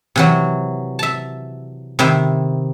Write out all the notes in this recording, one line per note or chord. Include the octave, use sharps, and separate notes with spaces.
C3 E3 F#3
E5 A5
C3 D#3 E4 E5